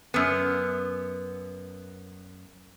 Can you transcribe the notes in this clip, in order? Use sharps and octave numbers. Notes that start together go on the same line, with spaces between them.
F#2 B3